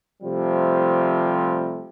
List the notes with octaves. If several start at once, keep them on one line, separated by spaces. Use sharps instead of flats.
C3 F3 G3 A3